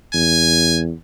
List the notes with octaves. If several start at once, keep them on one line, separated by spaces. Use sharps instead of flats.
E2 G#5